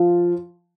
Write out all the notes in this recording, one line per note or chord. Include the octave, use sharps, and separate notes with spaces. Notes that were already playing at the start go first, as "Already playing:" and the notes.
Already playing: F3 F4